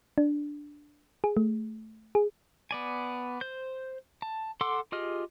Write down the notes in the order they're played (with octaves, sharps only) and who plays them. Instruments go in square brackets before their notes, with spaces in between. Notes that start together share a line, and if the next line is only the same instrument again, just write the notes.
[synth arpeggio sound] D4
G#4
A3
G#4
[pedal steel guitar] B3 D5 G#5
C5 G6
A5
A4 F#5 C6 D6 E6
F4 G4 G#4 D#5 F6